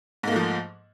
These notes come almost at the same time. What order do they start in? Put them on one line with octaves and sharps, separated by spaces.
G#2 A#3 A3 F3